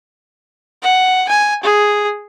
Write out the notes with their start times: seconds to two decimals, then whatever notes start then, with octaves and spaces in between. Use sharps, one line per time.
0.82 F#5
1.29 G#5
1.64 G#4